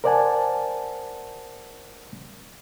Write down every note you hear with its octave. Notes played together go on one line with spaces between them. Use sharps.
A#4 C5 D5 F#5 G#5 A5